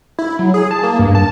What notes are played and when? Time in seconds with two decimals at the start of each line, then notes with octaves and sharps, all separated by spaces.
0.19 E4
0.39 F#3
0.54 G#4
0.71 A5
0.83 A#3
0.99 G2
1.15 A5